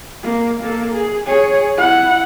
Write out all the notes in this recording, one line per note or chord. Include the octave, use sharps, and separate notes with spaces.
A#3
A#3 A4
G#4
G#4 C#5
E4 F#5